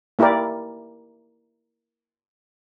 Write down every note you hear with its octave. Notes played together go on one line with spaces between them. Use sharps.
A#3 E4 G4 A#4 D5